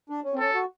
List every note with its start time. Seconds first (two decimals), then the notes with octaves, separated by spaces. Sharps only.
0.10 D4
0.24 C#4
0.34 C4
0.39 C#4 A4
0.54 F#4